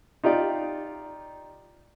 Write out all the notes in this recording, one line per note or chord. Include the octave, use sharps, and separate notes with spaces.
D#4 F4 G4 D5